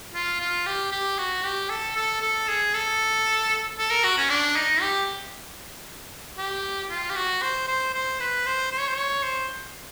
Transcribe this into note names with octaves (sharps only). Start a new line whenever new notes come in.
F4
F4
G4
G4
F#4
G4
A4
A4
A4
G#4
A4
A4
A#4
F#4
C#4
D4
D#4
G4
G4
F4
G4
F#4
C5
C5
C5
B4
C5
C5
C#5
C5
C#5
C5